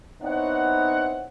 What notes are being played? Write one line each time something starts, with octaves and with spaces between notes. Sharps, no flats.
B3 C4 D#4 E4 C#5 F#5